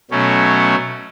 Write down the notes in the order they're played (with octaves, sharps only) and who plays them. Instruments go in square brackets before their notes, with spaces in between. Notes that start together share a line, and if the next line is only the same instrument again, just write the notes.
[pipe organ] B2 F#3 A3 C#4